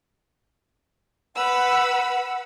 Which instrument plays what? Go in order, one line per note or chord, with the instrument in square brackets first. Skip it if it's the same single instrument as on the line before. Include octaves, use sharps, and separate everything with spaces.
[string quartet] B4 B5 E6 [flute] F#5